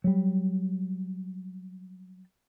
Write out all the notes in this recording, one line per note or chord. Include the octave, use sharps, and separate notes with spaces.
F#3 G3